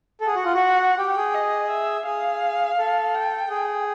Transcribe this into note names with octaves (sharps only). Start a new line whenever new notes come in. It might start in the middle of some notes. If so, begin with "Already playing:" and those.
A4
G#4 F#5
F#4
F4
F#4
G4 G5
G#4
D#5
E5
G#4 F5
A4
G5
G#4